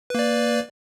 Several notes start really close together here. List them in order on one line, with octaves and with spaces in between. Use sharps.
B4 A#3 D5